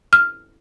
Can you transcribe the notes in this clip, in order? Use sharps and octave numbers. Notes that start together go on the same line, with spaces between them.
F6